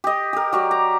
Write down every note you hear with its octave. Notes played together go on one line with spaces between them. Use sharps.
G4 D#5
G4 A#4
F#3 G4 D5
A#5